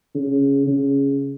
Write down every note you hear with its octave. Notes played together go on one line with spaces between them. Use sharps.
C#3
C#3